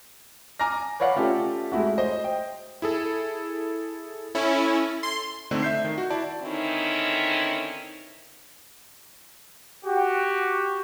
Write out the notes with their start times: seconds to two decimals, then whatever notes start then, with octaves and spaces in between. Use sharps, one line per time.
0.60 G#5 A#5 D6 F6 A#6
1.00 B4 C#5 D5 F5 F#5
1.15 A3 C#4 F4 G4 A4
1.72 G#3 A3 E4 F#4
1.98 C5 D#5
2.24 G5
2.82 E4 G#4 A4
4.35 C#4 E4 A4
5.03 C6
5.51 D3 A3 C4 D4 D#4
5.62 E5 G6 C7
5.85 D#3
5.98 F#4
6.10 E4 D5 A5
6.43 D3 D#3 C4 C#4 D#4 E4
9.85 F#4 G4